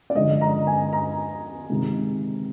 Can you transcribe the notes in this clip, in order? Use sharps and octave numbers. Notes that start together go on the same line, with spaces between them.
D5
D3 F3 G#3 D#5
A#5
G#5
A#5
C3 D#3 G#3